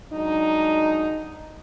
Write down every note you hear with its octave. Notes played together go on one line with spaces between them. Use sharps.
F#3 G#3 D4 D#4